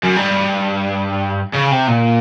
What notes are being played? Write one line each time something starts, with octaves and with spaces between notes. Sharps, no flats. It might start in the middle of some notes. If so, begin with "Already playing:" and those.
F#2
G2
C#3
C3
A#2